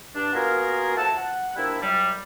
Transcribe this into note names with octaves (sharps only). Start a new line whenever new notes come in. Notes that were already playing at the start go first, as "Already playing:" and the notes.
G2 D4
A#3 B3 F4 F#4 G#4 A#4
F3 A3 F#5 A5
F#5
F3 G3 A#3 D4 E4
F#2 F#3 G3